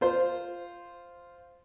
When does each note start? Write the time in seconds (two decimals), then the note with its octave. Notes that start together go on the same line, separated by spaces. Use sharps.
0.01 F4 C5